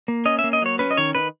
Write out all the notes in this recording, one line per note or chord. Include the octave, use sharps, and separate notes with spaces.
A#3
C#4 D#5
E5
A#3
D#5
F#3 C#5
C#4 B4
D#5
D#3 C#5
D#3 B4